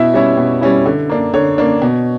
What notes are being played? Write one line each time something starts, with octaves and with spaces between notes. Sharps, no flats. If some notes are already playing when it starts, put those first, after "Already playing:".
Already playing: B2 E4 E5
G3 C#4 E4
B2
G3 C#4 E4
D3
A#3 D4
D3 C#5
A#3 D4
B2